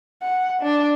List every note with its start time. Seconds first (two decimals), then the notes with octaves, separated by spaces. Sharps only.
0.22 F#5
0.62 D4